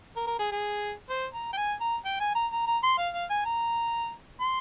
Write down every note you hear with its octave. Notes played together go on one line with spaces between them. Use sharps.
A#4
A#4
G#4
G#4
C5
A#5
G5
G#5
A#5
G5
G#5
A#5
A#5
A#5
C6
F5
F5
G#5
A#5
C6